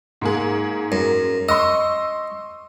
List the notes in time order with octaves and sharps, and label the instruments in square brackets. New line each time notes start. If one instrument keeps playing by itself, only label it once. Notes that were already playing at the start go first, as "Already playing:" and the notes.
[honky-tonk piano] G#2 A#3 G#4
[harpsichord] F#2
[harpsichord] D#5 [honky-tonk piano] C6 C#6 E6